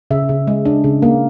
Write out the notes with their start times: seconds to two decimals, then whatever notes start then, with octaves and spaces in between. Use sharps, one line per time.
0.11 C#3 E5
0.29 C#3
0.47 G#3
0.65 D4
0.84 C#3
1.02 A#3